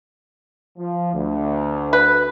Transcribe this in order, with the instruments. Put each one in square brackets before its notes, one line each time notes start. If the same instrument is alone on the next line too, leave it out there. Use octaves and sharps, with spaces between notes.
[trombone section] F3
D2
[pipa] B4